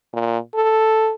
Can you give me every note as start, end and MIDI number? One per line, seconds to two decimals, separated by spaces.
0.13 0.38 46
0.55 1.12 69